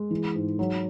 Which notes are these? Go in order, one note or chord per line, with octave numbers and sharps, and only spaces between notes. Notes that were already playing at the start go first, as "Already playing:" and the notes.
Already playing: G#3
E3
G#2
F#3